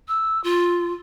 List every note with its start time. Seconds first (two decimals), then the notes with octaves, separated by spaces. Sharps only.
0.08 E6
0.44 F4